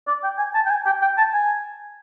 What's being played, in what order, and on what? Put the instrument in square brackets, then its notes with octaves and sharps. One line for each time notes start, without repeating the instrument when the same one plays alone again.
[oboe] D5
G5
G#5
A5
G5
G#5
G5
G5
A5
G#5